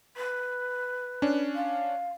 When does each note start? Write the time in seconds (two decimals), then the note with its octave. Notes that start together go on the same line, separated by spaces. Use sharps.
0.17 B4
1.22 C#4 D4
1.55 F5